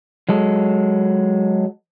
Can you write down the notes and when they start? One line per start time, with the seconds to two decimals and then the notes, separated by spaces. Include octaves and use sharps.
0.29 F#3 G#3 A4